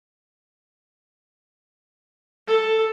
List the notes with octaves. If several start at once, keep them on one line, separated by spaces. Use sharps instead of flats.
A4